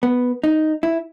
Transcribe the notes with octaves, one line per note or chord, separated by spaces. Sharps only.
B3
D#4
E4